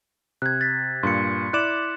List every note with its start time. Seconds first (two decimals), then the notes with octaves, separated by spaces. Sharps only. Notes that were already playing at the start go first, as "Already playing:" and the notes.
0.42 C3 F#6 G#6
0.61 A6 B6
1.03 G2 A#2 C6 C#7
1.53 E4 D5 D6 F#6 E7 F#7